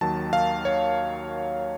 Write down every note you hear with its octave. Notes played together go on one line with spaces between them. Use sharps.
D#2 D#3 F#3 A5
F5
C#5